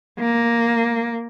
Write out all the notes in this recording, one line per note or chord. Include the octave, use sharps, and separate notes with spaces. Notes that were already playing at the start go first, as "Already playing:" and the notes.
A#3